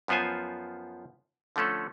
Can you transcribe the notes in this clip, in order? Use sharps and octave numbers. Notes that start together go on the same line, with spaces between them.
F#2 F3 B3 F4 C5 G#5
D3 F3 A3 C#4 A4